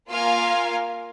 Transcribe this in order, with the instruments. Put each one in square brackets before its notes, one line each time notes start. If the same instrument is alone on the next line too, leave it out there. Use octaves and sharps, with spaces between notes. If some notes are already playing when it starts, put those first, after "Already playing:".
[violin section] A#3 F4 A#4 F5 G#5